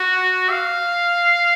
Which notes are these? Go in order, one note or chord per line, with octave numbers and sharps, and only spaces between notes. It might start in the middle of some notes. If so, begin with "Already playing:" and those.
Already playing: F#4
F5